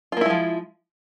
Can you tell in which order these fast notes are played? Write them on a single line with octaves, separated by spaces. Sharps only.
F4 A#3 E4 G#3 F3